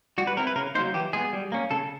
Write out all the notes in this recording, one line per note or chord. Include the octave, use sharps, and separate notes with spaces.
G3 F#4
B4
C4 E4 A#4
B4
C#3 A#4
F#3 A#3 D#4 C5
E3 G4
G#3 B3 G#4
G3
A#3 C#4
C#3 A4